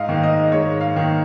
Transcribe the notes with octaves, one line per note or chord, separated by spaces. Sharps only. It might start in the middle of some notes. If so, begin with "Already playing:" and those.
Already playing: G#2 D#5 F5
D#3 A#3
D#5
G#2 C#5
F5
D#3 A#3